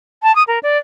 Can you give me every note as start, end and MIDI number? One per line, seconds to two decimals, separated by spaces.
0.23 0.34 81
0.35 0.43 87
0.47 0.59 70
0.63 0.78 74